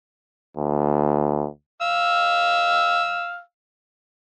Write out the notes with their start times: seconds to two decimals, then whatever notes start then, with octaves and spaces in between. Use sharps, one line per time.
0.57 D2
1.81 F5 E6